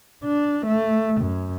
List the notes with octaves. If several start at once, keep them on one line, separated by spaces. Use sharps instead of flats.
D4
A3
F#2